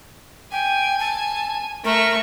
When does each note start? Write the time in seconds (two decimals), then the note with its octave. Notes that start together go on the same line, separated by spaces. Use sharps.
0.52 G5 G#5
0.99 A5
1.85 A3 A#4 C#6